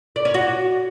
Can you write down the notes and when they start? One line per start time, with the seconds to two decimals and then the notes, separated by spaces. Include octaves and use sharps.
0.16 D5
0.25 C#4
0.34 F#4